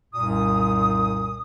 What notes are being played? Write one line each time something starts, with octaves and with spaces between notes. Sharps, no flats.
C2 F#2 A#2 D#6